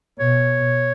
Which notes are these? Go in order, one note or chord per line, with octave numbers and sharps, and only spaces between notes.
B2 C#5